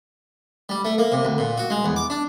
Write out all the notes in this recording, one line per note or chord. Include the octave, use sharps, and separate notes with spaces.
G3
A3
A#3
C3
D2
A#2
F#4
G#3
E2
D6
D4